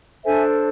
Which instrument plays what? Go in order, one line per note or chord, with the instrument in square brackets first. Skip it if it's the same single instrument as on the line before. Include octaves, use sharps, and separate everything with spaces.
[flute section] D4 A4 C5 E5 G#5